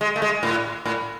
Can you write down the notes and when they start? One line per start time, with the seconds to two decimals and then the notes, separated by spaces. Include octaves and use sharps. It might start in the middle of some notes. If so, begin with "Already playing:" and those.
0.01 G#3
0.16 A3
0.22 G#3
0.43 A2
0.86 A2